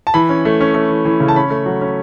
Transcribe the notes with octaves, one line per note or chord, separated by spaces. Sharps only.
A5
E3 B5
C#4
A3
C#4
A3
E3
E3
C#3
A5
C#4 B5
A3
F#3
C#4